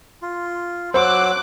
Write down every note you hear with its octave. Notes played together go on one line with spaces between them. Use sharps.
F4
F#3 C5 D6 E6 F#6